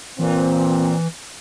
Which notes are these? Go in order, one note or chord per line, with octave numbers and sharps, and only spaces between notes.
A#2 E3 C4